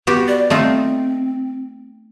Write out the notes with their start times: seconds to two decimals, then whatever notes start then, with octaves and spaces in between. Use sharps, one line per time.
0.07 B3 F#4 G4
0.28 D5
0.50 A3 C4 D#4 F4